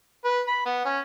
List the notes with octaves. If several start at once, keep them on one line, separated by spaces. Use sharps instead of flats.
B4
B5
B3
C#4